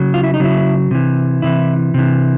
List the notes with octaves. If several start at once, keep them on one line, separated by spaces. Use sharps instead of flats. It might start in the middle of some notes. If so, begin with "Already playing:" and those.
Already playing: C#3 F#3
F4
E4
D#4
C#3 F#3 E4
C3 E3
C3 E3 E4
C3 E3